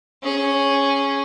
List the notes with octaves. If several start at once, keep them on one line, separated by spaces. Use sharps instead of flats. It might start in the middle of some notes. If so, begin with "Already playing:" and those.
C#4 G#4